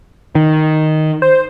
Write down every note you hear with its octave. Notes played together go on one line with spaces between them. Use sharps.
D#3
C5